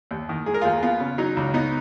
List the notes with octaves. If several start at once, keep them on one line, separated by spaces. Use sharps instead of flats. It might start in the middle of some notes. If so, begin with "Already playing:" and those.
D#2
D#3
G#3 G#4
A#4
D#2 F4 G#4
B3 F4
C#3
F#3 D#4
C#2
B3 D#4